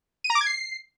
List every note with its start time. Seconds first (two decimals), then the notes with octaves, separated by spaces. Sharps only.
0.24 D#7
0.30 A#5
0.35 D6
0.41 G#6
0.46 C7